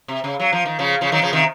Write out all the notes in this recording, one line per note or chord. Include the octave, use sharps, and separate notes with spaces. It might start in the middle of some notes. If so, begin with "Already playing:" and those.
C3
C#3
F#3
F3
D#3
C#3 F3
C#3 F3
D#3 F#3
C#3 F3
C3 D#3